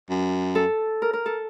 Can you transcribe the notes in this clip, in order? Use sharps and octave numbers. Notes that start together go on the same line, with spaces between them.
F#2
A4
A#4
A#4
A4